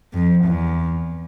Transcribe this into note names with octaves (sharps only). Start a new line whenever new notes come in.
F2
E2